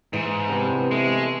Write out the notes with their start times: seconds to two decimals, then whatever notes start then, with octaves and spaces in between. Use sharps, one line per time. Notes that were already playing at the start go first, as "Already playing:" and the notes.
0.13 G#2 E3
0.49 G2 C3 B3
0.91 G#3 A3